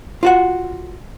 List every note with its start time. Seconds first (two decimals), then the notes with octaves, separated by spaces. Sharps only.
0.23 F4 F#4 F#5